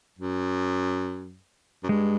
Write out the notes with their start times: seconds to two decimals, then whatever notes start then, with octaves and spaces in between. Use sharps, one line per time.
0.19 F#2
1.83 F#2
1.89 G2 G#3